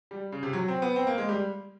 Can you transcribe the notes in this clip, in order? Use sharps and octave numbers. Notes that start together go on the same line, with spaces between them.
G3
C#3
C3
F#3
C4
B3
C4
A#3
G#3
G3